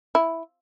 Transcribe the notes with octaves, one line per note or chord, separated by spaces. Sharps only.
E4